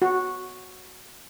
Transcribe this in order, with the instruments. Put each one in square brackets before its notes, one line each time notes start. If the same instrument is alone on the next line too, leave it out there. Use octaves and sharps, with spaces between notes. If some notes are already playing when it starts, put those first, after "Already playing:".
[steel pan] F#4